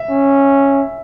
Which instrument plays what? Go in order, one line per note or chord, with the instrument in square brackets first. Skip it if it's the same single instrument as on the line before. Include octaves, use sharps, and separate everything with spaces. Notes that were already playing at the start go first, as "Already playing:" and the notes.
Already playing: [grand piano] E5
[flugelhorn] C#4